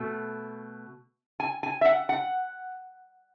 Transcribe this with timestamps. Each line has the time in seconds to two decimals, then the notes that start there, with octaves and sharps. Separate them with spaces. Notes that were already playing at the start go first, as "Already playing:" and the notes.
Already playing: B2 A3
1.40 G#5
1.63 G#5
1.81 E5
1.85 F#5
2.09 F#5